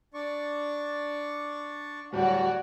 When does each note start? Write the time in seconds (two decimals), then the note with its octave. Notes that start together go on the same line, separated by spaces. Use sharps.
0.14 D4 D5 C#6
2.13 D1 G3 F#4 C#5 D5